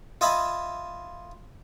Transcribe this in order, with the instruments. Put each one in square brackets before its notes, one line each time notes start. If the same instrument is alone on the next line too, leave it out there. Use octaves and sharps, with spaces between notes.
[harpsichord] F4 D#5 E5 G#5 A5 B5